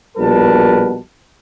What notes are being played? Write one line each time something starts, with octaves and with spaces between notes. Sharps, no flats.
A#1 B2 G3 A#4 B4 A5